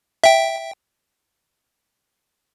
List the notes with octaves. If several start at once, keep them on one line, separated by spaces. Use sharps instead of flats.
E5 G5